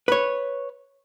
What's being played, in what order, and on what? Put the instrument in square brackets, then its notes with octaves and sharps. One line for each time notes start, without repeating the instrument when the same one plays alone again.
[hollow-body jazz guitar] B4 C#5